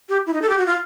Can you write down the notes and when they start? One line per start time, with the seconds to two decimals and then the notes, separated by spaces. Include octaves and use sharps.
0.09 G4
0.26 E4
0.33 D#4
0.42 A4
0.49 G4
0.58 F#4
0.66 F4